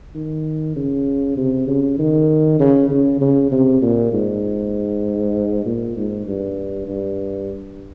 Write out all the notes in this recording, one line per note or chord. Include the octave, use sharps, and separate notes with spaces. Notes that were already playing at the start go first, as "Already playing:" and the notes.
D#3
C#3
C3
C#3
D#3
C#3
C#3
C#3
C3
A#2
G#2
A#2
G#2
G2
G2